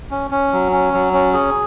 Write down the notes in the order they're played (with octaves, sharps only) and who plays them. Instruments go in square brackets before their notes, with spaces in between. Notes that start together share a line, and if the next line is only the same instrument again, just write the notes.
[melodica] C#4
C#4
F#3
C#4
F#3
C#4
G#4